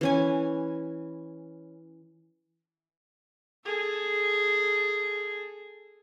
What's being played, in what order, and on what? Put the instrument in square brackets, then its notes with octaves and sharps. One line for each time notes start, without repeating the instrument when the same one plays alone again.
[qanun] E3 C#4 G#5
[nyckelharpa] G#4 A4